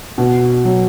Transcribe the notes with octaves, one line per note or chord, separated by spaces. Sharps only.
B2
F#3